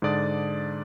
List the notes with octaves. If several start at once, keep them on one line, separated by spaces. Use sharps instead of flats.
G#2 D3 D4 D5 D#6 A6